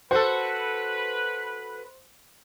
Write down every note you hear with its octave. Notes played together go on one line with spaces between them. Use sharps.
F#4 A4 B4 C5